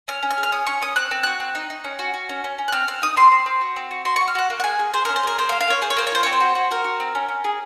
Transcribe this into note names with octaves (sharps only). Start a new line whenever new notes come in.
C#4 F6
C#4
F6
G#4
F6
C#4 D#6
C#4 C#6
C#4 D#6
C4 F#6
C4
F#4 F#6
C4
D#4
D#4
C#4
F#4
F#4
C#4
C#4
C#4
F#6
C4 F6
C4 F6
D#4 D#6
C4 C6
C4
C4
F#4
C4
F#4
F#4 C6
F#4 C#6
F6
F#4 F#6
A#3
F#5
G#4 G#5
G#4
G#4 C5
C#4 A#4
C5
G#4 A#4
A#3 C5
F5
A#3
F5
A#3 C#5
G#4 C5
C#5
A#3 C5
C#5
F4 C5
C4 C#5
C5
F#4
F#4
F#4 A#4
F#4
C4
C#4
C#4
G#4